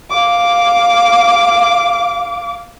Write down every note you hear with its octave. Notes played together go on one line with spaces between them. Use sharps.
F5 D6